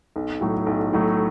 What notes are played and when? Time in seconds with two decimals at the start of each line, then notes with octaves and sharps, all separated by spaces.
0.16 B1
0.41 A2 F#3 A3
0.66 B1
0.93 A2 F#3 A3